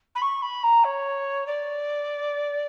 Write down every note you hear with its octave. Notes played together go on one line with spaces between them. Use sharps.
B5
C#6
B5
A#5
C#5
D5